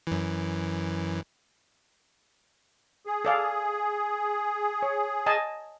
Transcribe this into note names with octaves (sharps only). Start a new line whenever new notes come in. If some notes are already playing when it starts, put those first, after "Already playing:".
F#2 E3
G#4
A4 D5 F5
C#5
D#5 G#5 A5